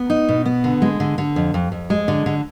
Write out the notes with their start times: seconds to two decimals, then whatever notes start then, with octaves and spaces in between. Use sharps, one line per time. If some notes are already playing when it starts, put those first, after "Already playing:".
Already playing: B3
0.10 D#4
0.29 B2
0.46 B3
0.64 D3
0.82 G#3
1.00 D3
1.18 D3
1.36 F2
1.54 F2
1.72 F2
1.90 G#3
2.08 D3
2.26 D3